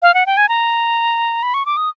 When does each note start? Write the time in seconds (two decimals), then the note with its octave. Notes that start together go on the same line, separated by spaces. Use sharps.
0.02 F5
0.14 F#5
0.26 G5
0.37 G#5
0.49 A#5
1.43 B5
1.54 C#6
1.66 D6
1.77 D#6